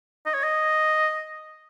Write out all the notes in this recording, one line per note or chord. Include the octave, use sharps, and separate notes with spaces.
D#5
C#5
D#5